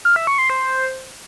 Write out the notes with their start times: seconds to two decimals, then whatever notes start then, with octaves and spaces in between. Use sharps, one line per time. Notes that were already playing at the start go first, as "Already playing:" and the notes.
0.05 F6
0.16 E5
0.27 C#6
0.38 C6
0.50 C5